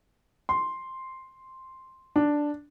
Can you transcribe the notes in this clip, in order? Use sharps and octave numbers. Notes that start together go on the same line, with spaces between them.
C6
D4